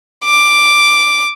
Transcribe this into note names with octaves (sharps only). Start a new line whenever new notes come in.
D6